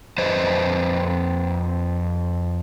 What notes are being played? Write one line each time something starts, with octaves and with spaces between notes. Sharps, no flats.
F2 B4 C5 D#5